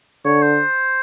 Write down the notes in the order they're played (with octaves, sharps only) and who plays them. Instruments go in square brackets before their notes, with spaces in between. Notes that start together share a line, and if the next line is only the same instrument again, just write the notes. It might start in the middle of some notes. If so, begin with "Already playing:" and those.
[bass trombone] D3 [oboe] C#5
[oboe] C5